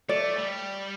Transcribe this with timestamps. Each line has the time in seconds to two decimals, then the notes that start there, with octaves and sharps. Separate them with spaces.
0.09 A3 D5
0.36 G3